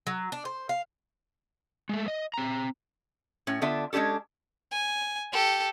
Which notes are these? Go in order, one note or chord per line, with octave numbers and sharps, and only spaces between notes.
F#3
D4
C5
F5
G#3 A3
D#5
C4 A#5
A2 C#4
D3 B3 D4 F4 E5
G#3 C#4 D4 G4 A4
G#5
G4 A4